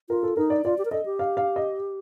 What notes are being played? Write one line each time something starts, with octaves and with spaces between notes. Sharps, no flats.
F4 A#4
A4
D#4 A#4
D5
F4 D5
G4
A#4
A4 D#5
G4
F5
F5
D#5